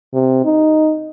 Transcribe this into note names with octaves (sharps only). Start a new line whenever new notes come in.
C3
D#4